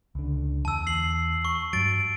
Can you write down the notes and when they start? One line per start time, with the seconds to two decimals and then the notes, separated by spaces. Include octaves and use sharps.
0.15 C#2 D3
0.65 E2 A5 E6
0.87 C7 F#7
1.45 C#6
1.73 G2 F#3 A6 D7